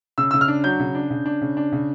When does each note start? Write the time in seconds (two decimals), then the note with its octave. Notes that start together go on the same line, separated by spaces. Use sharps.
0.18 C#3 E6
0.31 C#3 E6
0.41 F6
0.48 D4
0.64 F#3 G6
0.80 C#3
0.95 D4
1.10 C#3
1.26 D4
1.42 C#3
1.57 D4
1.72 C#3